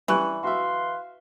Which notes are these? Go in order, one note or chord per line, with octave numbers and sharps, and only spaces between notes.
E3 G3 C#6 F#6
F#4 B4 E5 F5 C6